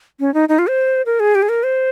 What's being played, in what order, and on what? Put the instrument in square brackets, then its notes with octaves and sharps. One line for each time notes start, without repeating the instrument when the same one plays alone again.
[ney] C#4
D#4
D#4
F4
C5
A#4
G#4
G4
G#4
A#4
C5